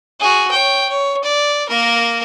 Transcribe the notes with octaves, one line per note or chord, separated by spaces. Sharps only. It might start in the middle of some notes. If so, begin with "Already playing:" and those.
F#4 G#4
C#5 G5
C#5
D5
A#3 A#4